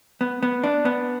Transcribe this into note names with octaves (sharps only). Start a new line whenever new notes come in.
B3
B3
D4
B3